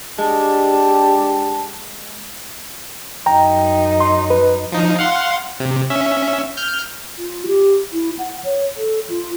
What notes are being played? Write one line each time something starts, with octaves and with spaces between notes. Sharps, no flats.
G#3 D4 G4 A5
F#2 D#4 G5 A#5
C6
B4
F3 D#4
F5 F#5 C6
C3
C#4 E5
F6 G6
F4
G4
E4
F#5
C#5
A4
F4